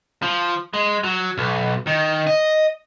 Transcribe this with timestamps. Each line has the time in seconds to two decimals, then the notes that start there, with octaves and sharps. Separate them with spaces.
0.23 F3
0.74 G#3
1.04 F#3
1.38 B1
1.87 D#3
2.27 D#5